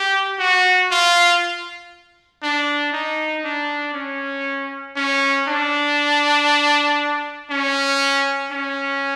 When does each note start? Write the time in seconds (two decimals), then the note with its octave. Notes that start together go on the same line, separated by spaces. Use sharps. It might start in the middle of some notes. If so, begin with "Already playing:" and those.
Already playing: G4
0.39 F#4
0.91 F4
2.42 D4
2.93 D#4
3.44 D4
3.94 C#4
4.96 C#4
5.47 D4
7.50 C#4
8.51 C#4